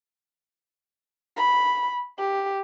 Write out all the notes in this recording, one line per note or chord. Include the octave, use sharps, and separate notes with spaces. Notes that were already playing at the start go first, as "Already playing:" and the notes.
B5
G4